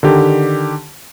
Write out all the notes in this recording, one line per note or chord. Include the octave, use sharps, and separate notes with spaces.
D3 D#3 G4